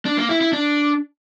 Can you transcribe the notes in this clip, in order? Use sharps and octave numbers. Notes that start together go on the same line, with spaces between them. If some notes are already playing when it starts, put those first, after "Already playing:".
D4
A#3
E4
E4
D4